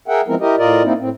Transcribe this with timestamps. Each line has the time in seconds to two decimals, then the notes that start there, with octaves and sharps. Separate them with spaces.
0.08 G#4 A#4 E5 F#5 G5
0.28 F3 G#3 B3 C4 E4 A#4
0.40 E4 G4 A#4 D#5
0.58 A2 F4 A#4 D5 D#5
0.83 A#3 C4 D#4 E4
0.98 A2 C4